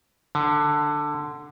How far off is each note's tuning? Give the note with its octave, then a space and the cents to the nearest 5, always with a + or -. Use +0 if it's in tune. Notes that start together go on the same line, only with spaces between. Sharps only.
D3 +10